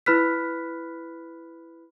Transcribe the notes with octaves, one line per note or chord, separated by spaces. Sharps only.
E4 B4 B5 F6 F#6 B6